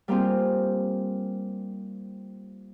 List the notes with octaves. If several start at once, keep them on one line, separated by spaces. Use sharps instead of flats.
G3 A#3 C4 F4 G#4